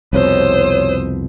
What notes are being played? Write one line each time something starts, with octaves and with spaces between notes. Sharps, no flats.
C2 F2 B2 C5 C#5 D#6 E6